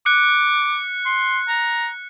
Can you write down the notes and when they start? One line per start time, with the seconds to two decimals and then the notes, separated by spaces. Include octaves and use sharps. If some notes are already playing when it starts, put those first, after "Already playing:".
0.06 D6 F#6 C#7
1.06 C6
1.48 A#5